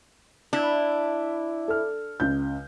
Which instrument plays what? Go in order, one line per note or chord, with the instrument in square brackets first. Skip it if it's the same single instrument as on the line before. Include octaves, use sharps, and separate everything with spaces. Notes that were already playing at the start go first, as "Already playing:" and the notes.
[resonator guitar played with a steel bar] D4 [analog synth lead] E4
[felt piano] A4 F6
C#2 G6